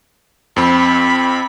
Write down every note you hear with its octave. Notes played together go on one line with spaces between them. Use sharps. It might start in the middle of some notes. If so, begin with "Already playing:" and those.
F2 C4 B5